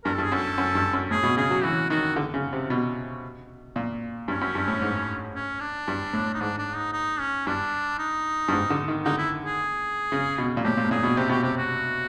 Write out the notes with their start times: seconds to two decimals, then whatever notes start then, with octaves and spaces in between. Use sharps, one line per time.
0.04 G2 A#4
0.14 G2 A4
0.23 G#4
0.32 F#2 A4
0.58 F#2
0.75 G2
0.93 F#2
1.11 A2 G#4
1.23 B2
1.37 C#3 G#4
1.50 F#3
1.63 E3 F#4
1.90 D#3 F#4
2.16 D3
2.34 C#3
2.53 C3
2.70 B2
3.76 A#2
4.28 G2 C#4
4.41 F#2
4.55 G2
4.68 A2
4.82 G#2
5.35 C#4
5.60 D4
5.88 G2
6.13 A2
6.34 D#4
6.41 G#2 D4
6.58 D4
6.76 D#4
6.93 D#4
7.20 C#4
7.47 G2 D4
7.99 D#4
8.48 G2
8.52 G#2
8.70 D3
8.88 D#3
9.05 D3 D#4
9.18 E4
9.45 G#4
10.12 C#3
10.38 B2
10.57 A#2
10.64 A2 G4
10.77 A#2
10.84 A2
10.91 A#2 G#4
11.03 B2
11.17 C3 G4
11.29 B2 G4
11.43 C3 G4
11.57 F#4